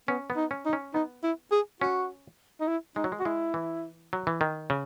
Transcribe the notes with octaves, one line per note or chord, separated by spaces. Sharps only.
B3 C#4
B3
D#4
C#4
D#4
C#4
B3 D#4
E4
G#4
C#4 F#4
D#4
E4
G#3 D#4
F#3
G#3
F#4
G#3 E4
E3
F#3
E3
D#3
C#3